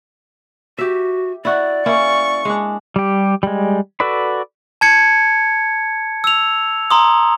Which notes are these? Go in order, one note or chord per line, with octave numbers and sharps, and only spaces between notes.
F#4 G4 E5
E4 F#4 D5
A#3 C#4 E4 C#6
G#3 D4
G3 G4
G3 G#3
F#4 A4 B4 D5 B5
A5 G#6 C#7
E6 F7
A#5 C6 D#6